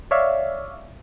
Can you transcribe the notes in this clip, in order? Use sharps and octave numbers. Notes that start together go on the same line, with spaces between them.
C#5 D5 E5 F5